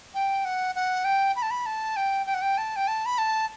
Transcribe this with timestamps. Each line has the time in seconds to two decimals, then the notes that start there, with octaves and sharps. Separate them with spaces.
0.14 G5
0.45 F#5
0.75 F#5
1.05 G5
1.36 B5
1.42 A5
1.51 B5
1.66 A5
1.96 G5
2.26 G5
2.34 F#5
2.42 G5
2.58 A5
2.76 G5
2.88 A5
3.06 B5
3.18 A5